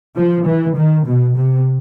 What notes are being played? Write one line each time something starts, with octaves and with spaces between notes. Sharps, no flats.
F3
E3
D#3
B2
C3